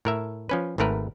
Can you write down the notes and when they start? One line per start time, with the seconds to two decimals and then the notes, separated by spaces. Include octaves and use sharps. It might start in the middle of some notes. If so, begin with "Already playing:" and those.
0.05 A2 A#4 E5
0.49 F3 C#4 B4
0.78 G#1 G#2 A3 A#4 B4